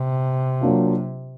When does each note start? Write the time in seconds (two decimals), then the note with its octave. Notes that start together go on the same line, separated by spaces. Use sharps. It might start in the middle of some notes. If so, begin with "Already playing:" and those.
Already playing: C3
0.61 F#3 A#3 D4 F4